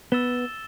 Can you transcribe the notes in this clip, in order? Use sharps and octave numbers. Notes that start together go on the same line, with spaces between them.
B3 E6 A6 E7 G7